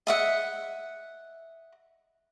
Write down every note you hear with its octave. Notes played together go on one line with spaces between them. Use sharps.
D#5 E5 F#5